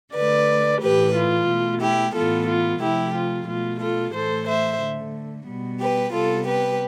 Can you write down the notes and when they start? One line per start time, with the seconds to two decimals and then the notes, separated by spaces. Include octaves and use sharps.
0.14 D3 A3 B4 D5
0.81 A2 E3 A3 G4 B4
1.14 F4
1.47 B2 A3
1.81 E4 G4
2.14 A2 E3 B3 F4 A4
2.47 F4
2.81 C3 F3 A3 E4 G4
3.14 F4
3.47 B2 A3 F4
3.80 F4 A4
4.14 A2 E3 A3 A4 C5
4.47 C5 E5
4.80 D3 A3
5.47 B2 G3 B3
5.80 G4 B4
6.13 C3 G3 B3 F4 A4
6.46 G4 B4